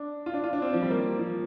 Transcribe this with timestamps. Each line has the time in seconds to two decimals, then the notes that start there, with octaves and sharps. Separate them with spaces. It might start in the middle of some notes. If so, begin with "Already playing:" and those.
Already playing: D4
0.26 F4
0.34 D4
0.44 F4
0.53 D4
0.62 C4
0.73 F3
0.82 G3
0.91 A#3
1.19 F3